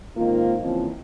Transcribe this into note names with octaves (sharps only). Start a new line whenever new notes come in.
G#2 D#3 A#3 C4 F4
C#3 E3 F3 A#3 C4